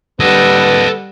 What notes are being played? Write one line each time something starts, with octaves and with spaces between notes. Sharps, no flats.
D3 G3 A#3 A4 B4 D#5 F#5